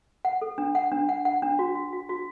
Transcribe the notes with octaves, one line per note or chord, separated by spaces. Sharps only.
F#5
A4
D4
F#5
D4
F#5
F#5
D4
F#4
F#4
F#4
F#4